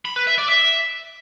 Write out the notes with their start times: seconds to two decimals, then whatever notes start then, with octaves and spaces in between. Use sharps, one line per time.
0.05 B5
0.16 B4
0.27 E5
0.38 D5
0.49 E5